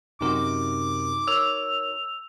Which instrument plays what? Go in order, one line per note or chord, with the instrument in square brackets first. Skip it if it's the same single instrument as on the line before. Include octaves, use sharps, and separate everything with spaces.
[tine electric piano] F#2 C3 A#4 [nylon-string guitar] D#4 F#4 [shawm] D6
[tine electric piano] A#4 C#5 [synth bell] E6 F7